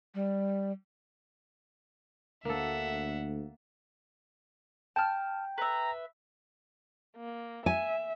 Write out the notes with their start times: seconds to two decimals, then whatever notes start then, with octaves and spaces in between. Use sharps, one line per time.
0.15 G3
2.45 D2 A#3 A4 E5 F#5
4.96 G5 A5 F6
5.58 B4 E5 A#5
7.17 A#3
7.66 E5 G#5